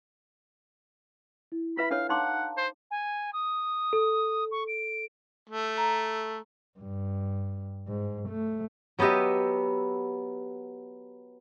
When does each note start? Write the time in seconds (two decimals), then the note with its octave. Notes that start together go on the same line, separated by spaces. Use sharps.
1.52 E4
1.77 F4 B4 E5 B5
1.91 D4 A4 C#5 F5
2.09 D#4 F5 F#5 A5 A#5 C6 D6
2.57 C5
2.90 G#5
3.33 D#6
3.93 A4
4.51 C#6
4.67 D7
5.50 A3
5.77 A#5
6.79 G2
7.88 G#2
8.28 A3
8.99 F#3 B3 G4 D#5 E5